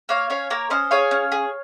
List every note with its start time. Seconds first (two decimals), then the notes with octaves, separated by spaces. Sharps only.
0.09 A#3 C#5 F5
0.30 C#4 C#5 F5
0.50 A#3 A#4 C#5
0.70 C#4 C5 D#5
0.91 G#4 C#5 F5
1.11 C#4
1.32 G#4